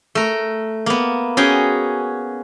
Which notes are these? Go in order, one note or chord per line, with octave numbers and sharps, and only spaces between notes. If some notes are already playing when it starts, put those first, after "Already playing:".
A3 A#4
A#3 B3
C#4 F#4 G#4 G5